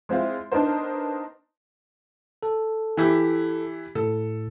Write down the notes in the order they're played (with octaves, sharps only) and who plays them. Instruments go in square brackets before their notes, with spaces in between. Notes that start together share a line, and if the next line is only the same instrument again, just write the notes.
[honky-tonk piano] G#3 C4 E4 F4
B3 D4 D#4 A#4 C5
[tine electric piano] A4
[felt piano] E3 E4 G4
[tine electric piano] A2 [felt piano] A4